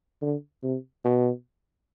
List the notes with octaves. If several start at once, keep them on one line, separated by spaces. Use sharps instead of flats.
D3
C3
B2